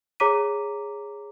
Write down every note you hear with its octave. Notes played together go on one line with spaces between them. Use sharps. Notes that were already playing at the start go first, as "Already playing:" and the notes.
G#4 C#5 A#5 D6 B6 D#7